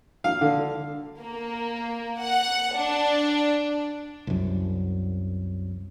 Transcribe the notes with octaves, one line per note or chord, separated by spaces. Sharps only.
F5
D3
A#3
F#5
D4
C2 F#2